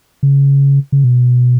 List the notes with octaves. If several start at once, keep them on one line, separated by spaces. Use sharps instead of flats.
C#3
C#3
B2